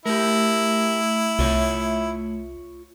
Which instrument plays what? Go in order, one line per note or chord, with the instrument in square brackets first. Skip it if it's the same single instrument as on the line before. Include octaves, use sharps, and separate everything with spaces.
[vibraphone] A3 [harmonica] E4 [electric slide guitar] G4 A#4
[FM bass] C2 [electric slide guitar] F4 C#5 E5